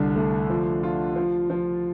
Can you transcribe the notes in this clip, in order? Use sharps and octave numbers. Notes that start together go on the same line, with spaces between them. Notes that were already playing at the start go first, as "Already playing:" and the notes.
Already playing: C2 D3
A3
F3
F4
F3
F3